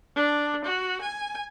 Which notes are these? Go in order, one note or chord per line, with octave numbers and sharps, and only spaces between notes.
D4
F#4
G#5